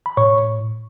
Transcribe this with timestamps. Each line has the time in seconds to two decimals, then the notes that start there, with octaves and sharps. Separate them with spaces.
0.06 B5
0.17 A2 C#5 C#6